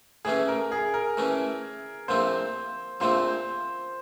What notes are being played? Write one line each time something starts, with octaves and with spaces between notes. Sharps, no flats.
A2 E3 A3 C#4 G#4
A#4
G#4
A#4
A2 E3 A3 C#4
A#1 A#2 F3 A3 C4 C5
A#1 A#2 F3 A3 C4 C5